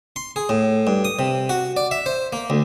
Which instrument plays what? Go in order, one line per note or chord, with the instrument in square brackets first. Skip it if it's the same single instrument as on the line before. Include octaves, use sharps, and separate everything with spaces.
[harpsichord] C6
G#4
A2
G2
D#6
C3
F#4
D5
E5
C5
A#3
D2